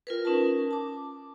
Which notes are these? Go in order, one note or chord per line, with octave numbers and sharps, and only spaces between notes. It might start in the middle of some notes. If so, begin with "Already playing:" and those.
F4 A#4 B4
C#4 D#4 A#4 A5
A5 D6